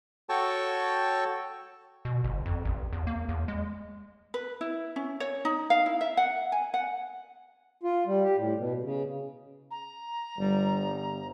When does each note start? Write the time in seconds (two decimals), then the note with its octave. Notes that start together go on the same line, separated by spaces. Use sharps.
0.29 F#4 A4 C#5 G5 A5 C#6
2.05 B2
2.24 G1
2.46 F2
2.65 A1
2.93 E2
3.07 A#3
3.29 E2
3.48 G#3
4.34 B4
4.61 E4
4.96 C#4
5.20 C#5
5.45 D#4
5.70 F5
5.86 E4
6.01 E5
6.17 F#5
6.52 G#5
6.74 F#5
7.83 F4
8.07 G3
8.23 G4
8.37 A2
8.58 B2
8.83 C#3
9.71 A#5
10.38 G1 G3